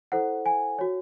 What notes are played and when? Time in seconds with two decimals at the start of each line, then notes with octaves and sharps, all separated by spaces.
0.12 E4 A4 C5 F#5
0.46 G#5
0.79 F#4 C#5